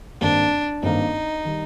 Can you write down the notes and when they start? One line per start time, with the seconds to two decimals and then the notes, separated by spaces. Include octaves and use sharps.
0.21 G#1 G2 D#3 A#3 D4
0.82 G#1 G2 D#3 A#3 D#4
1.45 D#3 G3